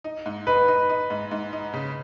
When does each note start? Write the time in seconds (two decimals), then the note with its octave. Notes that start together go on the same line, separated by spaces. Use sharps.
0.04 D#4
0.26 G#2
0.47 D#4 B4
0.68 D#4
0.89 D#4
1.10 G#2
1.31 G#2
1.53 D#4
1.74 C#3